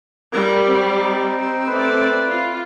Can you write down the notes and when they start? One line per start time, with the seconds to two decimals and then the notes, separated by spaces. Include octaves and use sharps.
0.33 G3 A#4
0.68 C4 F#4
0.97 D#4
1.67 A3 B4 D5
2.26 F4